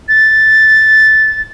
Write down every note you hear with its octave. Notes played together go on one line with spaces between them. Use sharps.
A6